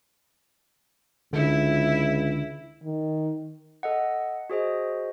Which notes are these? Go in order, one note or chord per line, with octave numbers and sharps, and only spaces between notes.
C#2 D3 E4
D#3
A4 D#5 F#5
F#4 G#4 C5 D#5